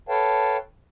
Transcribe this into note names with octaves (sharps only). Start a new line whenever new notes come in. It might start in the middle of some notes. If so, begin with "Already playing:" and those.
A4 B4 C#5 F5 G5 A5